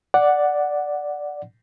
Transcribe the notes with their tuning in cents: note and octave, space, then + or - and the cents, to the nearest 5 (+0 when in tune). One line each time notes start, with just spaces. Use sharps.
D5 +0 F#5 +0